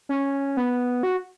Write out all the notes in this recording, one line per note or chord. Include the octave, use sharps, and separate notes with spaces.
C#4
B3
F#4